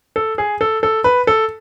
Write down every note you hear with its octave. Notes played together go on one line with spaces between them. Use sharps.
A4
G#4
A4
A4
B4
A4